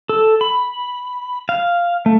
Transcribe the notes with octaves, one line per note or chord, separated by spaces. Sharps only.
A4
B5
F5
A3